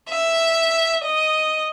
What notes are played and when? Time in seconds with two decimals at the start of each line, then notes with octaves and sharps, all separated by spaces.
0.09 E5
1.04 D#5